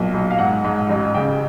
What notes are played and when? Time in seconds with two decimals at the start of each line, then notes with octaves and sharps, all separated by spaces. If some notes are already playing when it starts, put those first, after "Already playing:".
Already playing: B1 A#2
0.14 B1
0.31 F5
0.39 G#2 F#5
0.64 G#2
0.89 A1
1.14 C#3 G5